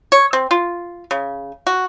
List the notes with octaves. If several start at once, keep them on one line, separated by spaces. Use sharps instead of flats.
C#5
C4
F4
C#3
F#4